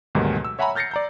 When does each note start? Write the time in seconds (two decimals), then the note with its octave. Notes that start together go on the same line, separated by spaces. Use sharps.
0.15 D2 G#2 B2 D#3 F#3 G3
0.45 E6
0.59 C#5 E5 F#5 G#5 A#5 B5
0.75 F6 G6 A6 A#6 C7 C#7
0.91 D5 A#5 G6